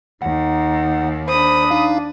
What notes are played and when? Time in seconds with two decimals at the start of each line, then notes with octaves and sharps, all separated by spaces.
0.22 D#2 D#4 F#5
1.28 D4 C5 B5 D#6
1.70 D#4 F5